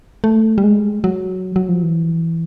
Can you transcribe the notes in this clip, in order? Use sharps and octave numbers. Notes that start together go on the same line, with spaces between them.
A3
G3
G#3
F#3
F#3
F3
E3